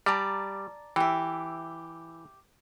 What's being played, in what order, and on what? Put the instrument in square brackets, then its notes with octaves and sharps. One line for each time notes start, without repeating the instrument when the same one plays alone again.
[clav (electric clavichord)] G3 [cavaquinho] D5 A5 A#5
[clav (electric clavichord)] E3 [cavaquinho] G4 E5